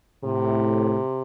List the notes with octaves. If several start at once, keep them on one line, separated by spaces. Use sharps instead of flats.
A2 C3